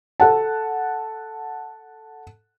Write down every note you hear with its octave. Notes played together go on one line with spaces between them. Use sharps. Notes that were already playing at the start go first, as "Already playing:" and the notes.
A4 F#5 A5